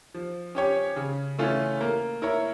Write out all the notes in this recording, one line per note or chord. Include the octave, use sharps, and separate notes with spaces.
F3
C#4 G4 C#5
C#3
E3 A3 C#4 F4
A#3
E4 A#4 C#5